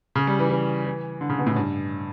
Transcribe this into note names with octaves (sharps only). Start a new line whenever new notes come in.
C#3
G3
E3
E3
E3
D3
C#3
B2
A2
G2